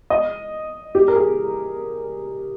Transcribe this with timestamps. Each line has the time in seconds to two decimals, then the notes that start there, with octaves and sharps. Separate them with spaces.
0.10 D#5
0.95 G4
1.08 A#4
1.16 G#4